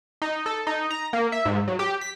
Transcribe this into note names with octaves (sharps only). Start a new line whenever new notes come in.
D#4
A4
D#4
A#5
A#3
E5
G#2
F#3
G4
B6